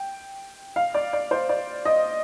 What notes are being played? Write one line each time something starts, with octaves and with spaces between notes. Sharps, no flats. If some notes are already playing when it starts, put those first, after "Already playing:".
Already playing: G5
F5
D5
D5
C5
D5
D#5